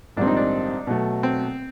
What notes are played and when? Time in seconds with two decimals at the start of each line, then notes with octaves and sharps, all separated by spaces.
0.17 A#1 G#2 D#3 G3 C4 D4
0.27 D#4
0.37 D4
0.87 B2 F#3 A3
1.23 C4